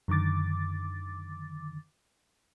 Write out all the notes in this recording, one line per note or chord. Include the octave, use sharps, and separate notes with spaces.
F#2 D3 D#3 D6 A6